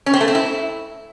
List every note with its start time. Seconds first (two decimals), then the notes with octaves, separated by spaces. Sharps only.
0.06 C#4
0.13 C4
0.21 A3
0.28 C4
0.35 E4